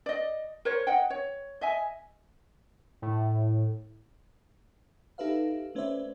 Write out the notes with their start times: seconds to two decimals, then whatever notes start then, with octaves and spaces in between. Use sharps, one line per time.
0.06 D5 D#5
0.65 A#4 C5 C#5
0.87 D#5 F#5 G5
1.10 C#5
1.61 D#5 E5 G#5
3.02 A2
5.18 D#4 G4 A4 B4 E5 F5
5.75 A3 C#4 B4 C5 D5 E5